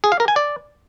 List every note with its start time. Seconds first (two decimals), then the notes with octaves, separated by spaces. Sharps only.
0.04 G#4
0.12 F5
0.20 A#4
0.28 G#5
0.36 D5